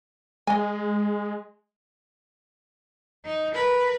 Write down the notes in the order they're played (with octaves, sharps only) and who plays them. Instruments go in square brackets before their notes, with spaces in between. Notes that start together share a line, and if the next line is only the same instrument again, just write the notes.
[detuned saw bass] G#3 [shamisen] D#5 G#5
[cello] D#4
A#4 B4